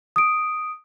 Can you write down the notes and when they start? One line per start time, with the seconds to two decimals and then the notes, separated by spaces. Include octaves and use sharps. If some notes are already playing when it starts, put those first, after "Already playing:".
0.16 D#6 D7